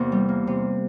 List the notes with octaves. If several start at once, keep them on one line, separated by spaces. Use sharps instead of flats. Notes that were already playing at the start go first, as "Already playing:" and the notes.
Already playing: E2 C3 A#3
G3
A#3
C3